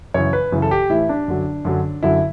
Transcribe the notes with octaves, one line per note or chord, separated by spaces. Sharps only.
F#2 C#3 E3 C#5
B4
F#2 C#3 E3
A4
G4
A2 E3 E4
D4
F#2 D3 F#3
F#2 D3 F#3
F#2 D3 F#3 E4